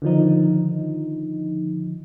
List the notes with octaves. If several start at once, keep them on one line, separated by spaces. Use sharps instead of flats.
D3 D#3 F3 D#4